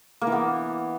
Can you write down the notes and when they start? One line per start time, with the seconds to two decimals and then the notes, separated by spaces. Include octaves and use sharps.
0.21 A#3
0.27 E3
0.32 B3